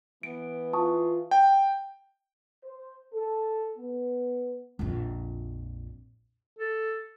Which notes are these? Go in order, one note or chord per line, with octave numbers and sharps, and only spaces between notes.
E3 B3 D7
F4 A5 C#6 D#6
G5
C5
A4
B3
A#1 F2
A4